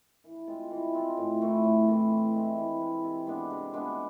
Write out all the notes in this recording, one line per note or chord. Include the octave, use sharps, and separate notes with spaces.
E3
G#3 C4 F4
E3
G#3 C4 F4
A2
E3 A3 C4
A2
E3 A3 C4
E3
G#3 C4 E4
E3
G#3 C4 E4
C3
G#3 B3 D4
C3
G#3 B3 D4